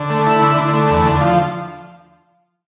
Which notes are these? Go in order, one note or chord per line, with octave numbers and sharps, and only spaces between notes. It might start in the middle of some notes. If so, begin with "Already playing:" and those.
Already playing: D3
A3
E4
D3
D3
A3
E2
D3
F3